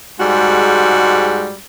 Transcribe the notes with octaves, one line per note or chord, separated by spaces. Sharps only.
G#2 G3 G#3 F#4